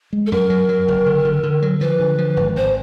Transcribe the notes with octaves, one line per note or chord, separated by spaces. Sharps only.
G#3
A4
F#2 A#4
F#3
F#3
F#1
D3
D3
D3
F#3
F3 B4
D3
F3
G#1
G#1 C5